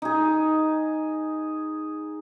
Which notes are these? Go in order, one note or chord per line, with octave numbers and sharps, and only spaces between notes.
D#4 G#4